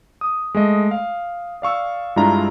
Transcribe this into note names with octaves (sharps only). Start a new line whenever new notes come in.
D#6
G#3 A3 D#5
F5
D5 F5 C#6 E6
G2 G#3 D4 E4 F4 A#5